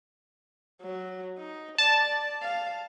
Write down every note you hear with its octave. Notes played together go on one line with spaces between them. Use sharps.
F#3
D#4
D5 A5
F5